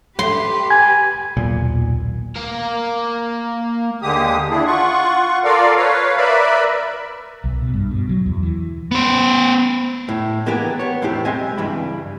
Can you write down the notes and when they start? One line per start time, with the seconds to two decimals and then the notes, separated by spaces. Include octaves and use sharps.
0.19 G4 B4 C6
0.71 G#5 G#6
1.37 D#1 B1 A#2
2.36 A#3 A#4
4.02 D#2 D3 G#3 A#3 G4 D#6
4.49 D4 E4 G#4
4.66 F4 F#5 C#6
5.44 F4 A4 A#4 D5 F5
5.76 B4 C#5 F5
6.17 A#4 B4 D5 E5 B5
7.44 B1
7.62 B2
7.73 G2
7.91 B2
8.09 F#3
8.26 E2
8.43 E3
8.91 B3 C5
10.09 A2
10.46 E3 A#3 B3 D4 G4 G#4
10.79 B3 C#5
11.02 E2 A2 C4 E4 G4
11.25 B1 G#3 C4 D#5 E5 G#5
11.57 C#2 G2 E3 G3 G4 B5